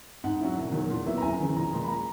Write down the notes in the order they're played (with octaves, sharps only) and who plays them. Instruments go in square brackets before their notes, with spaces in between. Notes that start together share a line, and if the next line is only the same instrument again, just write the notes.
[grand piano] G#2 F#5
F#3 C#4 E4
E1
E2 D#3 F#3
A#2
F#3 B3 E4
A#5
F#1 G#5
E2 C#3 E3
A#1 A#5
A#2 G#3
B5
A#5